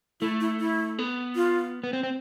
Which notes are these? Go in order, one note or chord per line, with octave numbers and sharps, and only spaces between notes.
A3 E4
E4
E4
B3
F4
B3
C4
C4